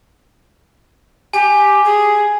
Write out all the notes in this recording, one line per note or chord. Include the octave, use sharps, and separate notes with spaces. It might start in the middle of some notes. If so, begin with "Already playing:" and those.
G4 G#5
G#4